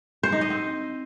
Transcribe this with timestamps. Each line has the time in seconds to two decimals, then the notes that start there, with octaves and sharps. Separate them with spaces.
0.23 C5
0.32 D#4
0.41 D#5
0.50 C4